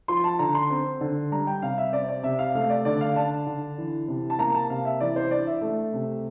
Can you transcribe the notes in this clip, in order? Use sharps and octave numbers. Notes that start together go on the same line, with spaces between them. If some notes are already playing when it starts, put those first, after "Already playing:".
F3 C6
A5
D3 A#5
C6
C4
D3
G3 A#5
G5
C3 F5
E5
C4 D5
D5
C3 E5
F5
A3 F5
D5
D3 D5
F5
D4 A5
D3
E3
C3
A5
A#3 A#5
A5
C3 F5
E5
E3 D5
C5
D4 D5
E5
A3
C3